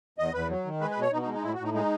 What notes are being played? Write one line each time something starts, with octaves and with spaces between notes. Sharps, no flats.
E2 D#5
E2 B4
F#3
D#3
G#3 B4
B4
B2 C#5
B2 D#4
D#4
G#3
D#4
A2 E4
F#4
A2
D#4
G#3 D#4